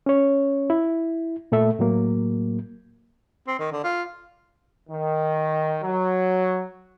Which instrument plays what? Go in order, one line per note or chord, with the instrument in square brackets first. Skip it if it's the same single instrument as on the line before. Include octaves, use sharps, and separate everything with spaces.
[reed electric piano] C#4 C#5
E4
A#2 A3 A4 E5
A2 F#3 A#3
[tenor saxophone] C4
D#3
D3
F4
[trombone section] D#3
F#3